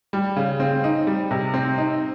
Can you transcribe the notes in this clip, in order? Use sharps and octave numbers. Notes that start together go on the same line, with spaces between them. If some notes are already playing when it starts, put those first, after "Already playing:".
G3
C#3
C4
D#4
G3
C3
C4
D#4